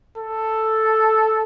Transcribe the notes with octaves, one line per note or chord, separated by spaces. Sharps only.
A4